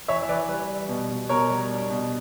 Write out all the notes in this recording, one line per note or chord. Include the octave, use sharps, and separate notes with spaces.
E3 C#5 E5
E5
E3 B4 D5
G3 B4
G3
B2
B2
B2 A#4 C#5
G3
D4
B2